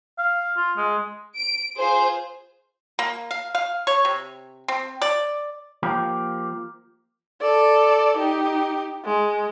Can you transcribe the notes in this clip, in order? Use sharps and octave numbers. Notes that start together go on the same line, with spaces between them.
F5
F4
G#3
D7
F4 G#4 C5
A#3
F5
F5
C#5
C3
C4
D5
F3 A#3 G4
A4 D5
D#4 G4
G#3